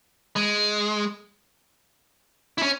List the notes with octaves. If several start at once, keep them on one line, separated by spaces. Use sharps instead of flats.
G#3
E4
C#4